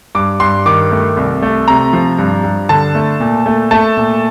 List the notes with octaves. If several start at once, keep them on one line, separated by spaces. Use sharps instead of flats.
G2 D6
G2 C6
D#3 D6
A3
C2
A3
C3 A#5
F3
G2
G2
D3 A5
A3
A#2
A3
A3 A5
A#2